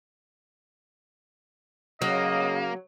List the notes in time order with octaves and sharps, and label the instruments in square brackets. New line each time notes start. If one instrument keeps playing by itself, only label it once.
[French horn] C#3 [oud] F#3 [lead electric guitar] A#3 [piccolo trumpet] D#5